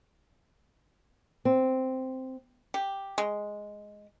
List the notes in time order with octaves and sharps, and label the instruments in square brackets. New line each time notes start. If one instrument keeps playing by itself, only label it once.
[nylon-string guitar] C4
[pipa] G4
G#3